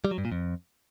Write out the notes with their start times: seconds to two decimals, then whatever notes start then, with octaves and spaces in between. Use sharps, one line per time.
0.05 G3
0.11 F#3
0.18 G2
0.25 A#2
0.32 F2